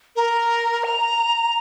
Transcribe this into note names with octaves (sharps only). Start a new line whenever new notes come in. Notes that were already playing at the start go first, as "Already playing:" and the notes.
A#4
A#5